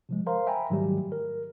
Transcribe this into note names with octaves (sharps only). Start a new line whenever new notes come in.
C3 F3 G#3
A#4 C5 F5 A#5 C6
E5 G5 G#5 A#5 B5
G#2 D#3 F#3 G3 A3 G4
A#4